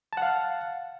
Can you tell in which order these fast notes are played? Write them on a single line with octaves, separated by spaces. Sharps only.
A5 F#5 F5